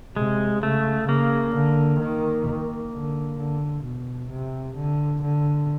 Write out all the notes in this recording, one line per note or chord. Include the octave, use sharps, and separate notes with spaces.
C3 G#3
C#3 A3
C#3 A#3
D3
D#3
D3
D3
B2
C3
D3
D3